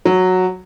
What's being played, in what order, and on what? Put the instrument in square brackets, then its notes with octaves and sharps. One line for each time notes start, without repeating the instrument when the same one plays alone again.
[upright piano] F#3